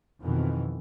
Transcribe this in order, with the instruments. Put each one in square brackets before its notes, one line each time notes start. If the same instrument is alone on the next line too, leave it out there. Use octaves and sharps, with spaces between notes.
[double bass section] F2 B2 D#3 E3